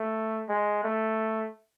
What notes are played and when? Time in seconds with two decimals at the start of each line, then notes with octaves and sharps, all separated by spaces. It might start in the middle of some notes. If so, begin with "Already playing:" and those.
Already playing: A3
0.49 G#3
0.84 A3